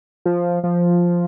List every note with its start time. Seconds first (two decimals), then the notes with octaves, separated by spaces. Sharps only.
0.26 F3
0.64 F3